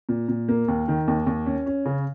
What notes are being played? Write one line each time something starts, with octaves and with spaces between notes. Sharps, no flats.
A#2
A#2
A#3
D#2
D#3
D#2
D#2
C#4
C#4
C#3